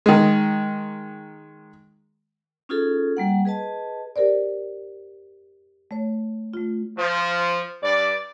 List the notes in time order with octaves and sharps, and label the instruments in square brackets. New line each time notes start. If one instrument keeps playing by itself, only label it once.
[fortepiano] D#3 G#3
[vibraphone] C#4 D#4 F4 F#4 G#4 A4
G3 A#3 F#5
G#4 B4 D#5 A5
[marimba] G4 A#4 C5 D5
A3 C#5
A3 F4
[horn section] F3
G2 D5